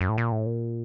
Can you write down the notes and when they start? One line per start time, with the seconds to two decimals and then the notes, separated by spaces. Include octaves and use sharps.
0.01 F#2
0.09 A2
0.18 A#2
0.32 A2
0.46 A#2